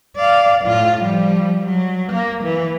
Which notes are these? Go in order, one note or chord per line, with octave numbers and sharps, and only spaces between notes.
D5 F5
A2 F4
F3 G3
F#3
A#3
E3